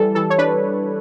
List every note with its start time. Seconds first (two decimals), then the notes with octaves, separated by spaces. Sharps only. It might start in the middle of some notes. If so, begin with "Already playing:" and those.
Already playing: E3 G3 A4
0.15 E3 A4
0.30 C#5
0.38 D4 B4